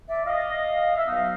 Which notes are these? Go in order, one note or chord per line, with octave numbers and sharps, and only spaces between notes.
D5 E5
D#5 F5
E5
B2 F#3 B3 D#4 D#5 F5